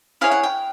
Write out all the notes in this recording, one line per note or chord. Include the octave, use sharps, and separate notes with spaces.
E4 G#4 C#5 F5
F#5
G5